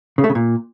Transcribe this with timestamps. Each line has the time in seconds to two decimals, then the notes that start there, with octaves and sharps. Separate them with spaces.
0.18 C#3
0.24 A3
0.30 C#3
0.35 A#2